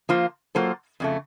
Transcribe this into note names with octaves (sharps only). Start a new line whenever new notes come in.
F3 A#3 F4 C5
F#3 A#3 F4 A4 C5
F2 C#3 A3